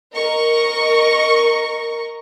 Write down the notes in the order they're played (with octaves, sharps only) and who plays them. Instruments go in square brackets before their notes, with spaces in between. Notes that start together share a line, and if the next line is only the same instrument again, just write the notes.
[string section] A#4 D#5 C#6